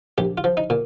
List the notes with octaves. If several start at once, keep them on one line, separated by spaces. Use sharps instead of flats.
A#1 G4
F4
F3
D#4
A#2